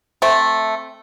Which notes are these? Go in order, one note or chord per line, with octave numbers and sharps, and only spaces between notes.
A3 C4